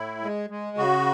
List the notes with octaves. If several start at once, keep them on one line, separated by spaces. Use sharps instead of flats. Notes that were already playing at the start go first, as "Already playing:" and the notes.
Already playing: A2 E4
G#3
G#3
C#3 F#4